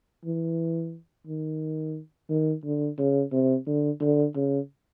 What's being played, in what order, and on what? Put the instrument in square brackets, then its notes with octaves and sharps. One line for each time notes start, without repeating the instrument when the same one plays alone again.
[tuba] E3
D#3
D#3
D3
C#3
C3
D3
D3
C#3